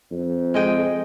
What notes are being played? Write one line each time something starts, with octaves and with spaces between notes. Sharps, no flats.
F2
G#3 D#5 G5